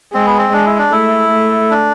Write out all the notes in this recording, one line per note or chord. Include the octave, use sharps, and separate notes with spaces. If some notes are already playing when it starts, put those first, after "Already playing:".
G#3 C4
B3
C4
G#3 D4
E4
D4
A3 E4
A3
D4